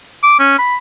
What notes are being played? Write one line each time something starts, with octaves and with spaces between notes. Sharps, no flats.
D6
C#4
B5